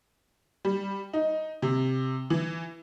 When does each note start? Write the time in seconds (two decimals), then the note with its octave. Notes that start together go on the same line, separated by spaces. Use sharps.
0.65 G3
1.13 D#4
1.62 C3
2.30 E3